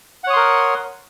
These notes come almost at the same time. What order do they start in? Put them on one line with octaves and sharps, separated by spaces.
F#5 C#5 D#6 C6 A#4